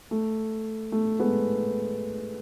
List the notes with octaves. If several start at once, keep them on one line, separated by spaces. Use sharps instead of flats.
A3
A3
G#3 B3